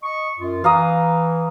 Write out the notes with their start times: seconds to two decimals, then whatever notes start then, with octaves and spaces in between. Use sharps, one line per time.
0.02 D#5 C#6
0.39 F#2 F4
0.64 E3 F5 A#5 D#6